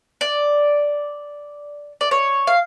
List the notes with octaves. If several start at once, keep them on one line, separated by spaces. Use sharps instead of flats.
D5
D5
C#5
F5